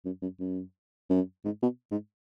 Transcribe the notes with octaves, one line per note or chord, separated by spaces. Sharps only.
F#2
F#2
F#2
F#2
G#2
B2
G#2